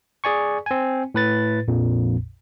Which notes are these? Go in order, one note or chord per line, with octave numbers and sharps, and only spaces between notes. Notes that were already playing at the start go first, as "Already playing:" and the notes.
G#4 D5 G#5 C#6
C4 G#5
A2 B4 A6
A#1 F2 A#2